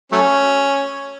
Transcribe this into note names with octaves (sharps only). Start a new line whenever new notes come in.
F#3 A3 C#4